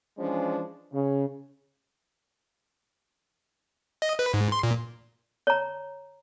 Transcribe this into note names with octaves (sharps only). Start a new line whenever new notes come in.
E3 F3 G#3 C#4 D4
C#3
D#5
B4
G#2
C6
A#2
C#5 A#5